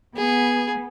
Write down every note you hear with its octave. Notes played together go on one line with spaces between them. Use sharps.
B3 G#4